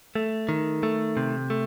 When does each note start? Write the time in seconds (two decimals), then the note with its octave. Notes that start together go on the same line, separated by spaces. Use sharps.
0.16 A3
0.49 D#3
0.83 A3
1.17 C3
1.50 A3